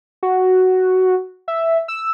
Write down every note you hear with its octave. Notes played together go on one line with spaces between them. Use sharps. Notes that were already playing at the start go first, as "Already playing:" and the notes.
F#4
E5
E6